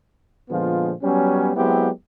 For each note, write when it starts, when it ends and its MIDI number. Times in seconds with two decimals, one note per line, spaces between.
0.50 0.92 46
0.50 0.92 50
0.50 0.92 53
0.50 0.92 56
0.50 0.92 59
0.50 0.92 65
1.03 1.51 54
1.03 1.51 55
1.03 1.51 59
1.03 1.51 61
1.56 1.89 54
1.56 1.89 56
1.56 1.89 59
1.56 1.89 60
1.56 1.89 64
1.56 1.89 67